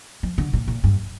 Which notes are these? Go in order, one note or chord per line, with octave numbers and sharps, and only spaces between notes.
F3
D3
A#2
A#2
G2